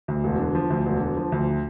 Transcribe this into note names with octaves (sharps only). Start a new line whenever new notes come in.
D2
E1
D3
F3
D2
E1
D3
F3
D2